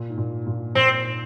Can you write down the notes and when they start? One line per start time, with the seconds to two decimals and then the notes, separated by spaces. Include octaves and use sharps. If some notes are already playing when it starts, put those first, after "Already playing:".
Already playing: A#2
0.10 G#2
0.18 A#2
0.47 A#2
0.75 A#2 C4